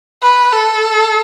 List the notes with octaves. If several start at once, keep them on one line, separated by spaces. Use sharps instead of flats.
B4
A4